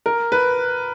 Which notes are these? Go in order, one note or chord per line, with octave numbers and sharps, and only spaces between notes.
A#4
B4